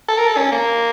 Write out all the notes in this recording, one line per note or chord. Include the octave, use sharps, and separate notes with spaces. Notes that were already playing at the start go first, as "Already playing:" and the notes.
A4
A#4
A4
C#4
A#3